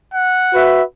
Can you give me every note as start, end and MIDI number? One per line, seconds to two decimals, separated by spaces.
0.14 0.65 78
0.53 0.82 66
0.53 0.82 71
0.53 0.82 76